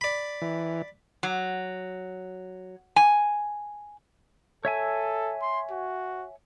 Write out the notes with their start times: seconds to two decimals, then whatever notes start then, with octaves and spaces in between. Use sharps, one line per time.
0.01 D5 B5
0.42 E3
1.23 F#3
2.96 G#5
4.65 A4 C#5 E5 G#5
5.42 C6
5.71 F#4